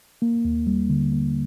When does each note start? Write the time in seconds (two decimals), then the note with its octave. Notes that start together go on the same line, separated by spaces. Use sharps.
0.22 A#3
0.45 D#2
0.67 G3
0.90 D3
1.13 A#3